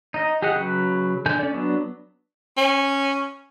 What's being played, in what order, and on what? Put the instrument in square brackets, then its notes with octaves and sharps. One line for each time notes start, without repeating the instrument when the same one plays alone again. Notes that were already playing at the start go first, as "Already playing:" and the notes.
[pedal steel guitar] D#4 D#5
G4 G#4 D#5 F#5
C#3 F#3 B4
D3 A4 G#5 G6
C#4 D5
F#3 B3 D4
[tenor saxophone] C#4